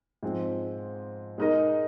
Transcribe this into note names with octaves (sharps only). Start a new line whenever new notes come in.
G#2 F3 C4
G#3 D#4 A#4 D#5